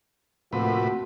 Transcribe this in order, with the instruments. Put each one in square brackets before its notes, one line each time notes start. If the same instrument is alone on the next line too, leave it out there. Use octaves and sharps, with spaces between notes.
[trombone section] D2 F3 A#3 [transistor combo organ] A2 C3 B4 [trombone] F#4